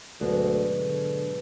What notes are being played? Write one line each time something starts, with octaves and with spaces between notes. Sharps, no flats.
D2 G#2 B2 F#3
D3